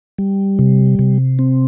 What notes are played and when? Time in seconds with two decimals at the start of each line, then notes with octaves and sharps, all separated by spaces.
0.18 G3
0.59 C3
0.99 C3
1.39 C4